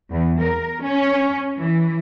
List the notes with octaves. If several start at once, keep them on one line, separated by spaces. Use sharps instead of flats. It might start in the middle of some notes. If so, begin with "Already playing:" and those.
E2
A#4
C#4
E3